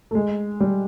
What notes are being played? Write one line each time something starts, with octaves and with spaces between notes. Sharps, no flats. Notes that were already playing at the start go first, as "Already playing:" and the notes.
A3
G#3
G3